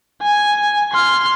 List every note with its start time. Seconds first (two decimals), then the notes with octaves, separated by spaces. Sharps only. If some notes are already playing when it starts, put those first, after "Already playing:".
0.22 G#5
0.93 C6 F6